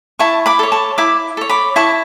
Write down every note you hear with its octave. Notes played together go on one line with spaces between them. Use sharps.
E4 A5 C#6
B5 D6
A4 C#5
A5 C#6
E4 B5 D6
A4 C#5
B5 D6
E4 A5 C#6